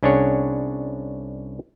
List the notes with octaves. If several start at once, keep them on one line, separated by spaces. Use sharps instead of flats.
C2 C#4 D4 G#4 C#5 F#5